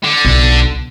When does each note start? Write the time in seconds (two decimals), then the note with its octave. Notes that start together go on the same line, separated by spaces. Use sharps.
0.04 D3
0.25 B1